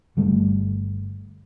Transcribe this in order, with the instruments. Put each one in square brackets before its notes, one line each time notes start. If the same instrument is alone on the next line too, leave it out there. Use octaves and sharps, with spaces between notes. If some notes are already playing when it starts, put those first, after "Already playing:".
[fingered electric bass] G1 G3 A3